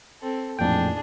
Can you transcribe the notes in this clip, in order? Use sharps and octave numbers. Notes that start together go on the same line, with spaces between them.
C4 A4
A1 F2 A#2 D4 G#4 G5